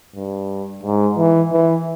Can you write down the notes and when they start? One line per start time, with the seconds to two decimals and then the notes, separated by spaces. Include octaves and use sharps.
0.15 G2
0.83 G#2
1.17 E3
1.52 E3